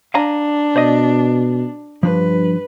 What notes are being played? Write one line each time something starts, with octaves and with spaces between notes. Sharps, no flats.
D4 F5 G#5 A#5
B2 C5 D5 D#5
G2 F3 D4 B4